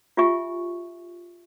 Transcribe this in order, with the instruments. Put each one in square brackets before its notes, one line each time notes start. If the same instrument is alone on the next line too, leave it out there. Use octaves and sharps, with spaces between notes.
[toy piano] F4 G4 E5 G#5 C#6